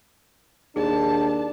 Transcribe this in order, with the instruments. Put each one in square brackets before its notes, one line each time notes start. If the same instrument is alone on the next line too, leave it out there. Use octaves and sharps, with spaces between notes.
[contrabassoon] D#2 [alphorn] D4 [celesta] G#4 [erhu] A5